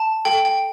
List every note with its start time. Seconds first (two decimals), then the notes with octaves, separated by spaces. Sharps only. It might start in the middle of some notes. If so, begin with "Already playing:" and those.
Already playing: A5
0.25 A4 G5
0.45 G5